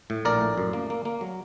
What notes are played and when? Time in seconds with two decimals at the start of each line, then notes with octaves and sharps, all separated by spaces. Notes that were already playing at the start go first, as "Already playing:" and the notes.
0.10 A2
0.25 A#1 A#4 D5
0.41 A2
0.58 F#2
0.73 A#3
0.90 A#3
1.05 A#3
1.21 F#3